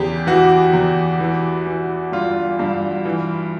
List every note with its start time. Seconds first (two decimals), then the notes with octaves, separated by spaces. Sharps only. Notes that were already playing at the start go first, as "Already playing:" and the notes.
Already playing: E2 C#3 G4 G#4
0.27 E3 F#4
0.73 E2
1.20 E3
1.67 E3
2.12 G2 F4
2.59 G2
3.05 E3